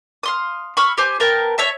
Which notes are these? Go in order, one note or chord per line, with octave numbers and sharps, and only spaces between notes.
F5 C6 D#6
B5 C#6 E6 F6
G4 C5 G#5
B3 A#4 G5 A5
C#5 E5 A5